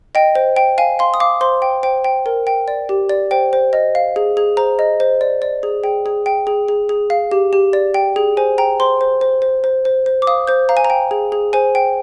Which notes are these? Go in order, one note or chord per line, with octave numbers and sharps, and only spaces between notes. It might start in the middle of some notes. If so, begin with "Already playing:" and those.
D#5 G5
C5
G5
F5 G#5
F5 C6
D#6
F5 D6
C5 C6
G5
C5 G5
G5
A#4
G5
D5
G4
D5
C5 G5
C5
D#5
F5
G#4
G#4
C5 A#5
D#5
C5
D5
D5
G#4
G#4 G5
G#4
G5
G#4
G#4
G#4
F5
G4
G4
D5
G5
G#4
C5 G#5
G5 A#5
C5 C6
C5
C5
C5
C5
C5
C5
D6
F5 D#6
C5 G6
F5 A#5
G#5
A#5
G5
G#4
G#4
C5 G#5
G5